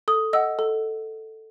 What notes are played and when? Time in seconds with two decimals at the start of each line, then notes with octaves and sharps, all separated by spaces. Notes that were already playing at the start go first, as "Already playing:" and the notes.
0.08 A4 D#6
0.33 D#5 F#5 E6
0.59 A4